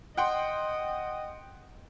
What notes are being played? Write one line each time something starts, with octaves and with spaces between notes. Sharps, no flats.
D#5 F#5 G5 C6